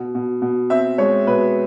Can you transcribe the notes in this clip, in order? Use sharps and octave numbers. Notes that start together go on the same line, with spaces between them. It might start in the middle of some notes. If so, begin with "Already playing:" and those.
Already playing: B2
B2
B2
C4 E5
G#3 C#5
B2 B4